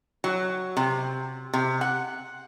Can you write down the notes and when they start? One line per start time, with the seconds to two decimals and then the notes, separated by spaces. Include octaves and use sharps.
0.24 F#3
0.77 C3
1.53 C3
1.81 F#5